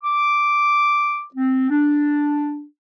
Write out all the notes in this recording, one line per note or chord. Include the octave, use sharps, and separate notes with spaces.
D6
C4
D4